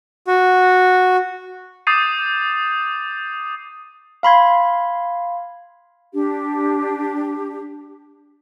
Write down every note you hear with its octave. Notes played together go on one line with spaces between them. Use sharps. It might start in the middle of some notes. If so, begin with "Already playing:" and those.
F#4
D6 D#6 G6 A6 C7 D#7
F5 B5 C6 G#6
D4 G4